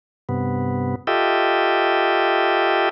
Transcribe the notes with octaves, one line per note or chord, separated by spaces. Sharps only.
G2 C3 B3
F4 G4 A4 D#5 E5 G5